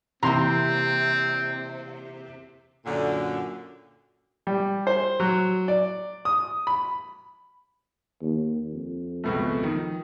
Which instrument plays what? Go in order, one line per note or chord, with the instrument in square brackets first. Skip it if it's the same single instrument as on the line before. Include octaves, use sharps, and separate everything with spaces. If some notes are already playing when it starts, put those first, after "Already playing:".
[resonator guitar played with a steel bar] C3 [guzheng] E3 A#3 [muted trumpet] C4 [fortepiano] A#5 C6
[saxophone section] F#2 A#2 D3
[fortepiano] G3
C5
F#3
D5
D#6
B5
[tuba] D#2
F2
[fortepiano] C#2 B2 A3
[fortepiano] D#3 [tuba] F3